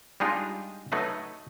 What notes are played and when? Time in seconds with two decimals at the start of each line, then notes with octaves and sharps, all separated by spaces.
0.20 G3 G#3 D4 D#4 F4
0.92 F#3 A3 D#4 B4 E5